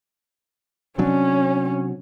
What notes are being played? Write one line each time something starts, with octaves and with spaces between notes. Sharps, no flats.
C3 F#3 C#4 D4